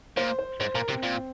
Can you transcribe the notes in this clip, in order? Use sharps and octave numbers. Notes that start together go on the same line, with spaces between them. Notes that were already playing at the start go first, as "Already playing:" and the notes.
A#2 C5
C5
G#2 C5
A#2 A#4
C3 C4
A#2